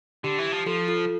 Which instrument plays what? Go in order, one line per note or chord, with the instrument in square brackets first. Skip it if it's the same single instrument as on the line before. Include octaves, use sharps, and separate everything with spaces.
[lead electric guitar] D3 [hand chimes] G4
[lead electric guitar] E3
F3
[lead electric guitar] F3 [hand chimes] F4 A4
[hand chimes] F4 A4